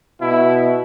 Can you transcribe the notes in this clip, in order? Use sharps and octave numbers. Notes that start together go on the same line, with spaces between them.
B2 E4